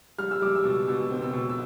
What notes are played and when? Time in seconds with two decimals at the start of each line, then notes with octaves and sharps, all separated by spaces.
0.18 G3 F6
0.31 E6
0.41 G3 D6
0.55 E6
0.64 B2
0.87 B2 E6
1.10 C4
1.22 E6
1.33 B2
1.49 E6